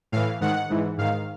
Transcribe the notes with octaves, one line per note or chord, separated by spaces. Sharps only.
A2 E3 F5
G#2 D#3 F#5
G#2 E3
G#2 D#3 F5